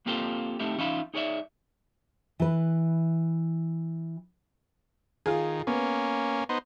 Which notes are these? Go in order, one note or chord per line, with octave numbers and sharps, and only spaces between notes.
A#3 C4 F4 G4 A4 C5
A3 C4 D#4 E4 G4
E3 C#4 D#4 F4 E5 B5
D#4 G#4 C#5 D5 E5
E3 B4
D#3 F4 G#4
A#3 B3 C#4
B3 D#4 C5